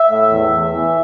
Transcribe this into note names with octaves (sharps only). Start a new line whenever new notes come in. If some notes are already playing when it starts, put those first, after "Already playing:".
Already playing: E5
A2
E2
E2
E3